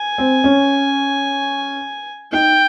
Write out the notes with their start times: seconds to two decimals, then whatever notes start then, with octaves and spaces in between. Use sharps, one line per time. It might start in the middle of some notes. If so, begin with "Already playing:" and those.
Already playing: G#5
0.18 C4
0.44 C#4
2.32 D#4 G5